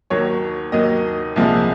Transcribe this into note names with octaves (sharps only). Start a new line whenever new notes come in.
D#2 D#3 F#3 C#5
D#2 D#3 F#3 D#5
C2 A#2 F3 G#3